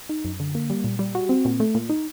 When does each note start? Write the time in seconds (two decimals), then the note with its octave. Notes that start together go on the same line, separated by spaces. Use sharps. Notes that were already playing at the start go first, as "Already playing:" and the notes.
0.09 D#4
0.24 F#2
0.40 D3
0.55 A#3
0.70 G3
0.84 A#2
0.99 G3
1.15 F#4
1.29 C4
1.45 A#2
1.60 A3
1.75 A#2
1.89 D#4